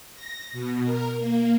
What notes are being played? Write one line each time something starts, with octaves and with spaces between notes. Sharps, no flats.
A#6
B2
A#4
A#3